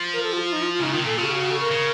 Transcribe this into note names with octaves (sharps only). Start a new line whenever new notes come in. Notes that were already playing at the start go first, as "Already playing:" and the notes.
Already playing: F3
A#4
A4
F4
F4
D#4
F4
F4
C#3 D#4
D#3 F4
C3
A#2 A4
C#3 F4
A4
F#4
F#4
A4
A#4
C#3